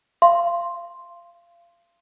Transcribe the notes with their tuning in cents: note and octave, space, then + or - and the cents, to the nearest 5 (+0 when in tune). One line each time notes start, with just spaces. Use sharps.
F5 -25 C6 +0